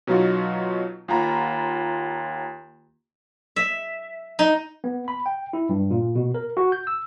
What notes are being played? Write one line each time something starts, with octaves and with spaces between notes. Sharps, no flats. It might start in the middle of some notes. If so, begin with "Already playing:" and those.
B2 F#3 D#4 F4 F#4
D#2 F4 F#5 A#5 B5
E5
D#4
B3
B5
G5
E4
G2
A#2
B2
A#4
F#4
G6
E6